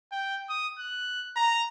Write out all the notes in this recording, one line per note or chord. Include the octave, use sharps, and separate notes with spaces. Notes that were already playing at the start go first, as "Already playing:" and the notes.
G5
D#6
F#6
A#5